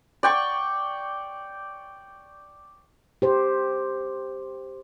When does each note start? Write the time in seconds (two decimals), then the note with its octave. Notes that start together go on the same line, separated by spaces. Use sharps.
0.23 D5 G5 C#6
3.22 G4 C5